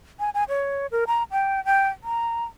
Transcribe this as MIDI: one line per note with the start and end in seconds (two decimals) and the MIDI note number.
0.19 0.30 80
0.34 0.44 80
0.49 0.87 73
0.91 1.04 70
1.07 1.23 82
1.31 1.63 79
1.65 1.88 79
2.04 2.44 82